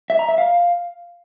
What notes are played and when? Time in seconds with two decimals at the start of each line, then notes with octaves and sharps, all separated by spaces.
0.10 E5
0.19 A#5
0.29 E5
0.38 F5